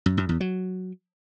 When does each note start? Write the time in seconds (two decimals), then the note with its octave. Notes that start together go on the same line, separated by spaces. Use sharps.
0.06 F#2
0.17 F#2
0.29 E2
0.41 F#3